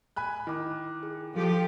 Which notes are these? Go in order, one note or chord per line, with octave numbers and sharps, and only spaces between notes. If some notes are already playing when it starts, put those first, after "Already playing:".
G#5 B5 F#6
D#3 E4 D6 F#6
G#4
F3 G4 A4